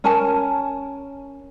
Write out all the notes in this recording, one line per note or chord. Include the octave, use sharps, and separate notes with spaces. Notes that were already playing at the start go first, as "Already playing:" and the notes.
C#4 A#4 G#5 A5